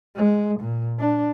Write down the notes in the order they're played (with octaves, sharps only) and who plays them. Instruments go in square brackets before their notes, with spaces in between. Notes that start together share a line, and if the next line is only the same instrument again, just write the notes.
[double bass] G#3
A#2
D4